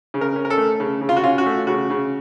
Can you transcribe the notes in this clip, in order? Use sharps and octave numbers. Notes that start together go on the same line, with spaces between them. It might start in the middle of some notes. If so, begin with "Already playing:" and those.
C#3
A#4
C#4
A#4
A4
A3
C#3
C#3
F4
F#4
C#4 F4
F#4
A3
C#3 F#4
C#3